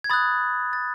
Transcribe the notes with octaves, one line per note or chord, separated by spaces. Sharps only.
G#6
B5 D#6 F#6 A6
A6